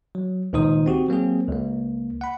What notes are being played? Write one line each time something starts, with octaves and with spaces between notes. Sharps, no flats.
F#3
C#2 A#2 D#3 D#4 C5 D#6
C4 F#4 G4
F#3 A#3 C4 G#4
C#2 A#3
F#5 B5